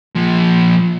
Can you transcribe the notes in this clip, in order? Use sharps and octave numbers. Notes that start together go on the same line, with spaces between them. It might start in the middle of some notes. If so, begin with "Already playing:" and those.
A#2 F3